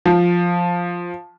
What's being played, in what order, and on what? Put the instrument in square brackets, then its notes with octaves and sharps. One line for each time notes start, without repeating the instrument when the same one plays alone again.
[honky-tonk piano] F3